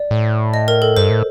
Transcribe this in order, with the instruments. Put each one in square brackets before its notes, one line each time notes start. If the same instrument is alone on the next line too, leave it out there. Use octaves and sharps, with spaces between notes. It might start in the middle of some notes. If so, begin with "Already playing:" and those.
Already playing: [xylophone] D5
[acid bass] A2
[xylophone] D#5
A#4
A4
[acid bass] G2 [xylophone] C5
[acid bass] A2